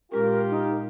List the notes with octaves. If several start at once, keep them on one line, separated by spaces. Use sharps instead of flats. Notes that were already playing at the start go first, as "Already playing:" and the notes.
A#2 G#3 C#4 F4 G4 A#4
D#4